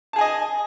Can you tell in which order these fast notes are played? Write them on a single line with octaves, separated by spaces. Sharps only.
A5 G#4 G#5 D#5